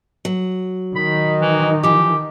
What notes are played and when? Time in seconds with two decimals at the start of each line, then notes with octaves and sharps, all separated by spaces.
0.25 F#3
0.96 D#3 D#4 B5
1.41 E3
1.83 E3 F3 G4